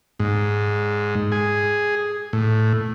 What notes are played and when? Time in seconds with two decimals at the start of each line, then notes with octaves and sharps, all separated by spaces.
0.20 G#2
1.32 G#4
2.33 A2